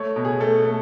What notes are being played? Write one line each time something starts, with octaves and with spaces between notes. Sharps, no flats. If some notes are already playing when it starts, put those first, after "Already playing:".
Already playing: A3 C#5
B2
G#4
A3 A4
A3